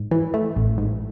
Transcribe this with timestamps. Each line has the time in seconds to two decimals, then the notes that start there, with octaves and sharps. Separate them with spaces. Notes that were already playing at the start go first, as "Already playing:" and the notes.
Already playing: G#2
0.11 E3
0.34 A3
0.56 A1
0.78 G#2